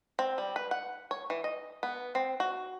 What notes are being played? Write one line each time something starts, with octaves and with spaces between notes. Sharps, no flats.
C4
G3
B4
F#5
C#5
E3
D#5
B3
C4
F#4